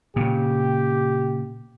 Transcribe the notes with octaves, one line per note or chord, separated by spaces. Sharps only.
A#2 C#3 G4